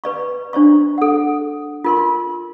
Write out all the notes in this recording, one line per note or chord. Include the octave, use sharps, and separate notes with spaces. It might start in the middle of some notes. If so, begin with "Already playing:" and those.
B4 D5 C#6
D4 C5 D5 C#6
A4 F#5
F4 A#4 C6